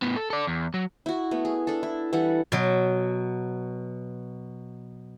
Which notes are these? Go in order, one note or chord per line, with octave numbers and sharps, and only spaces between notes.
A2 B3
A4
A4 D5
E2
F#3
E4 F#4
A3 B3
G#4
D4 A4
E4
E3 G3 A4 F#5
B2 F#3